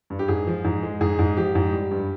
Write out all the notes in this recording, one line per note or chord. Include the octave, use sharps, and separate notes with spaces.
G2
G4
G#2 G#4
F3
G#2
G#3
G#2 G#4
G#2
F3 G4
G#2
G3
G2